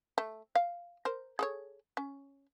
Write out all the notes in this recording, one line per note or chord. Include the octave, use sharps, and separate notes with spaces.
A3
F5
A#4 C5
G#4 A4 C#5
C#4